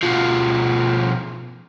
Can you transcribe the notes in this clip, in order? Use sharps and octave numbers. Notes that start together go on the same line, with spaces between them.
B2 F3